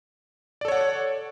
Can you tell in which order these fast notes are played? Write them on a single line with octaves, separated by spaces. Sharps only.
D5 A4 C#5 F#5